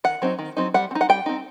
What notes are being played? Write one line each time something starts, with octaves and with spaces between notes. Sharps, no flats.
D#3 F#5
F#3 C4 D#4
D#3
F#3 C4 D#4
G3 F#5
C4
D#4
F#5
G3 G5
C4 D#4